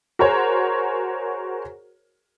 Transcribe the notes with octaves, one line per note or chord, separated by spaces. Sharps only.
F#4 G#4 A#4 C5 C#5